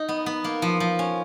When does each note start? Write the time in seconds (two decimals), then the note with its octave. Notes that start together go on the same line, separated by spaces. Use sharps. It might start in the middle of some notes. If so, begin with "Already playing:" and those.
Already playing: D#4
0.09 B3
0.26 B3
0.44 A#3
0.62 F3
0.80 F3
0.99 C#4